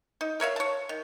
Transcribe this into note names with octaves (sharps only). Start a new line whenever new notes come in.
D#4
A#4 C#5 E5 F5
C#5 A5
D#3